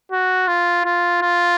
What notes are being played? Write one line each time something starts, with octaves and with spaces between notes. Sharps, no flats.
F#4
F4
F4
F4